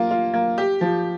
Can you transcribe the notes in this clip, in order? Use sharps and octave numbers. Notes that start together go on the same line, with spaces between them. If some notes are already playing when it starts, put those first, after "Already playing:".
Already playing: A#3 F4
F4
A#3
G4
F3